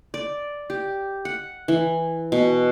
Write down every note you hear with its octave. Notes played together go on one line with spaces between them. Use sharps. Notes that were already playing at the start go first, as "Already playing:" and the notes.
D5
G4
F#5
E3
B2